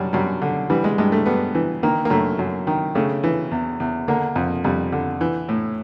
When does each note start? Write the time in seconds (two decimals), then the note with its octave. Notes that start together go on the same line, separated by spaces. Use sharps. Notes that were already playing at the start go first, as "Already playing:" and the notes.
Already playing: F#2 G3
0.13 F#2 G3
0.42 D3
0.70 E3 G3
0.84 G#3
0.98 G2 G#3
1.12 A3
1.26 G2 B3
1.55 E3
1.83 D#3 A#3
2.05 A#3
2.10 F#2 A3
2.39 F#2
2.67 D#3
2.95 C#3 A3
3.24 E3
3.51 E2
3.80 E2
4.08 D3 A#3
4.36 F2
4.64 F2 G3
4.92 D3
5.21 E3
5.49 A2